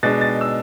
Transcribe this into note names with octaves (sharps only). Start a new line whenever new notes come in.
B2 G#3 D4 A6
A6
E6